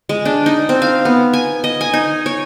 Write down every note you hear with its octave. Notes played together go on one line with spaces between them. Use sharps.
G#3
D4
D#4
C4
F5
B3
G#5
D#5
G#5
D#4
C#5